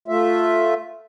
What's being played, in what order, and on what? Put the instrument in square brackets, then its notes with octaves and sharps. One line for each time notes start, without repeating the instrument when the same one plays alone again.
[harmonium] A3 F4 E5